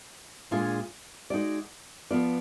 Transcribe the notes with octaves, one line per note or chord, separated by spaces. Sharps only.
A#2 G#3 D4 F4 G#4
G#3 D#4 F#4 D5
F3 B3 F4 B4 D5